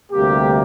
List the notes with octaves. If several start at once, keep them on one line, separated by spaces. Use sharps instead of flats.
D2 C3 G3 A#3 G4